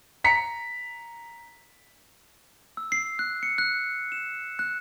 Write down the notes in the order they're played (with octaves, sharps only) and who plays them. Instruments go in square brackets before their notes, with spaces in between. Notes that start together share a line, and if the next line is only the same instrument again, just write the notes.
[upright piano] A#5 B6 C#7
[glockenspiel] E6
C7
F#6
C#7
F#6
E7
F#6